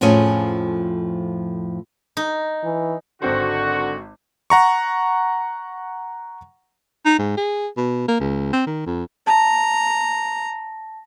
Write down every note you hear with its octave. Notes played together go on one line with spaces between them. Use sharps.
F2 A2 F3 C#4 G#4 G#5
D#4
E3
G#1 D3 C4 F#4 C5
F#5 A#5 C#6
D#4
G#2
G#4
B2
A#3
C#2
C4
D#3
F2
A5 A#5